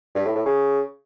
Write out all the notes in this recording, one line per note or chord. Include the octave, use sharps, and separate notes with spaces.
G2
A2
A2
C#3